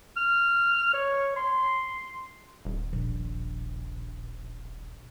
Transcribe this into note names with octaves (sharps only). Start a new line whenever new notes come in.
F6
C#5
C6
D#1
A#1